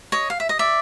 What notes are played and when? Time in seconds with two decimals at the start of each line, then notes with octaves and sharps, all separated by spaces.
0.12 C#5 D#5
0.30 F5
0.40 E5
0.49 D#5
0.59 D5 E5